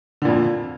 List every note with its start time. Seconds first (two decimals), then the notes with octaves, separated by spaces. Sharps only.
0.22 D3
0.25 A#2
0.28 F2